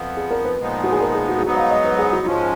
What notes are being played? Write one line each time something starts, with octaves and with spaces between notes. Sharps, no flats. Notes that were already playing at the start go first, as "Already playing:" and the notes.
Already playing: F2 F3 B3
G#4
A#4
B4
A#2 F3 G#3 B3 D#4
F#4
G#4
A#4
G#4
F#4
G#4
G#2 F#3 B3 D#4 F#4
F5
D#5
B4
G#4
F#4
G#2 F3 G#3 C#4 F4